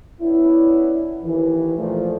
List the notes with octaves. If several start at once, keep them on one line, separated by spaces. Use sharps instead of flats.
B3 C#4 D4 E4
D#2 E3
A#2 F3 A3